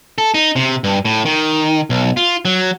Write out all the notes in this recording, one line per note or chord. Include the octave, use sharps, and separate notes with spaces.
A4
D#4
C3
G2
A2
D#3
B1
F4
F#3